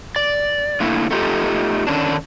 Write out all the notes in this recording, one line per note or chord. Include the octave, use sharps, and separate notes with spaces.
D5
D3 A3 A#3 E4
A3 B3 D#4 F4 G4 A4
D3 D#3 C#4 D4